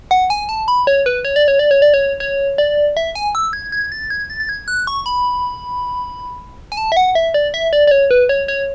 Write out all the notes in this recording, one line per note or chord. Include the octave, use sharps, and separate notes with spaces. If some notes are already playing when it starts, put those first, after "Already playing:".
F#5
G#5
A5
B5
C#5
B4
C#5
D5
C#5
D5
C#5
D5
C#5
C#5
D5
E5
G#5
E6
G#6
G#6
A6
G#6
A6
A6
G#6
F#6
C#6
B5
G#5
A5
E5
F#5
E5
D5
E5
D5
D5
C#5
B4
C#5
C#5